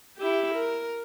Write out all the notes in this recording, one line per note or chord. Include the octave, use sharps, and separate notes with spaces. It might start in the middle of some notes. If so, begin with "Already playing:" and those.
E4 G4
A#4